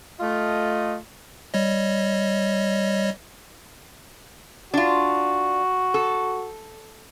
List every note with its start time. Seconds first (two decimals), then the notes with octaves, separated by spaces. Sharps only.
0.20 A3 F4 D#5
1.54 G3 C#5 D#5
4.74 D4 F4 F#4
5.94 A4